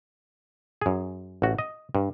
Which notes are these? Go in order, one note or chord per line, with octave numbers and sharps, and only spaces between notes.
F#2 G#4
A1 F#4
D#5
G2